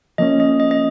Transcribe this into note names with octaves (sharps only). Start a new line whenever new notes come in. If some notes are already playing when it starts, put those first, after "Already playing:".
F3 A#3 C#4 D#5
D#5
D#5
D#5